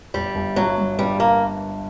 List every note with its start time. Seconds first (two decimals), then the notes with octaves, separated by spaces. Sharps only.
0.14 G1 G3
0.35 G1
0.56 G2 F#3
0.78 G2
0.98 G2 G3
1.20 A#3